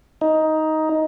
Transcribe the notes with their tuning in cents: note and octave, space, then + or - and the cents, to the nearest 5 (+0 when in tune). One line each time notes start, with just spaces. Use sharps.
D#4 +10